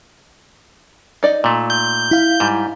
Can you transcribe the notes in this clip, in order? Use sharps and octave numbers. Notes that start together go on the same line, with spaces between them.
D#4 D5 D#5
A#2 A3
G6
E4 F5
G#2 G3